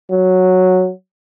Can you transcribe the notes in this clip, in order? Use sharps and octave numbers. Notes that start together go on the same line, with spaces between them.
F#3